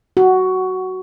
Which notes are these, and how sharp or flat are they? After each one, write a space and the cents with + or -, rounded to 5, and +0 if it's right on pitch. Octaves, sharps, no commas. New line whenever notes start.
F#4 +10